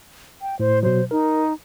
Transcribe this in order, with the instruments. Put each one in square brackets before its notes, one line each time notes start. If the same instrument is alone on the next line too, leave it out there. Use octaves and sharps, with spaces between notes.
[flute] G5
[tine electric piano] A2 [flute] C5
[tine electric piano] B2 F#3 [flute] C5
[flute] D#4 [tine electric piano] A#4